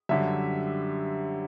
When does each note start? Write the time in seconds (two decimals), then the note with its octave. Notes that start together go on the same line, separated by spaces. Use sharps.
0.09 F#2 D3 G3 E5